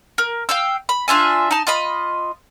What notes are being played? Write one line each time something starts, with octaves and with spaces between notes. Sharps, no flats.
A#4
F5 G5 E6
B5
D4 F4 E5 G#5
D#4 A5
F4 D#5 B5